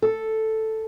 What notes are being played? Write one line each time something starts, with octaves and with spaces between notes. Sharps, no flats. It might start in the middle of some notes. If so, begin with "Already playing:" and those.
A4